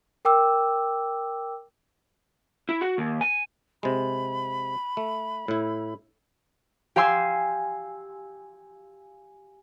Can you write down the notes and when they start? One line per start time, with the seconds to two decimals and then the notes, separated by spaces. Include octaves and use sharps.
0.25 A#4 G5 D6 E6
2.69 E4
2.81 F#4
2.98 D#2
3.21 G#5
3.83 C3 G#3 B5
4.97 A3
5.48 A2 E4
6.96 G4 F5 G#5 C6 E6